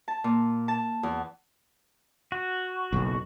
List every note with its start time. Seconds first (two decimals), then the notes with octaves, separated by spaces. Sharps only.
0.08 A5
0.24 A#2
0.68 A5
1.03 E2
2.32 F#4
2.92 F#1 B1